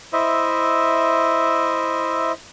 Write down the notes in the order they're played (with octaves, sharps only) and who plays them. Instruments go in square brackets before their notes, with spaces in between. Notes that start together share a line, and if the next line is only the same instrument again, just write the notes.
[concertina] E4 C5 D#5 E5